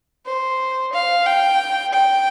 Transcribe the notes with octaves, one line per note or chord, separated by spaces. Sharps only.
C5
F5
G5
G5